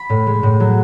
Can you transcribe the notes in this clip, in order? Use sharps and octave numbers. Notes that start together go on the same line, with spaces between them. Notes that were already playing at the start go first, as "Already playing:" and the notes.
Already playing: B5
A2
G#3
A2
F#3